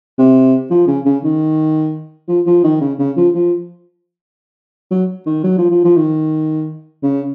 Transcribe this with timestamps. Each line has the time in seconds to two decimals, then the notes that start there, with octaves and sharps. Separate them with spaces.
0.18 C3
0.70 F3
0.87 C#3
1.05 C#3
1.24 D#3
2.28 F3
2.46 F3
2.64 D#3
2.81 C#3
2.99 C#3
3.17 F3
3.34 F3
4.91 F#3
5.26 D#3
5.44 F#3
5.58 F3
5.71 F3
5.84 F3
5.96 D#3
7.03 C#3